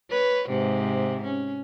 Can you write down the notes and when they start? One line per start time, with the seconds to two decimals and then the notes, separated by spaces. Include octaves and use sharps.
0.11 B4 C#5
0.49 G#2 C3
1.24 C#4